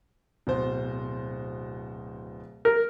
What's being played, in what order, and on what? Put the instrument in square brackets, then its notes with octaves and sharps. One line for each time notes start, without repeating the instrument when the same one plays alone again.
[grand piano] D1 B2 C5
[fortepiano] A#4